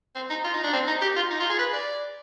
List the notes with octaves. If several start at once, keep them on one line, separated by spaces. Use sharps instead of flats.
C4
D#4
F4
D#4
D4
C4
D#4
G4
F4
D#4
F4
G#4
B4
D5